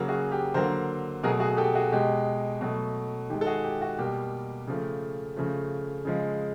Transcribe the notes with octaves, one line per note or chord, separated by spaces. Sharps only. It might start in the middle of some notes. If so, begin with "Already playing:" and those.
Already playing: C#3 F#3 A#3
F#4 G#4
G4
D3 F#3 A#3 A#4 C5
B2 F#3 A3 G#4 A#4
F#4 G#4
G4 A4
F#4 G#4
B2 G#3 G4
B2 F#3 A3
D#3 G#3 G4
A4
F#4 G#4
G4
F#4
B2 G3 A#3 G4
C#3 F3 A3
C#3 F3 A3
C#3 F3 G#3